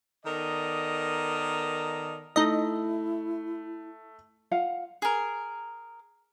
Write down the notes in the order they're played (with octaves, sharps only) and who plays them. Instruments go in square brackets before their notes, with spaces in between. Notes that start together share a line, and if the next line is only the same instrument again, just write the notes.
[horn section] D#3 B3 A4 A#4 D5 D#5
[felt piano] A3 [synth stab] D#4 D#5 [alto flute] E4
[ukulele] F4 F5 F#5
[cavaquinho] G#4 A#4